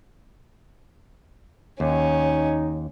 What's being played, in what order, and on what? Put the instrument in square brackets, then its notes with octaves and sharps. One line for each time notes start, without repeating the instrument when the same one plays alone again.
[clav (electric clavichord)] D#2 [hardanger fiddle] C#4 [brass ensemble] D#4